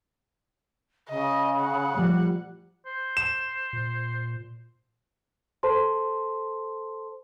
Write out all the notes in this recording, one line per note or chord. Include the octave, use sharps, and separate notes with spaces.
C#3 D#5
F#5
F3 G3 A3
C5
E7
A#2
A4 C5 A5 C6